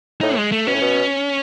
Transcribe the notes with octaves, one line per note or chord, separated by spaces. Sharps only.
A2 D#4
G#3
A3
B2 C#4
A2
B2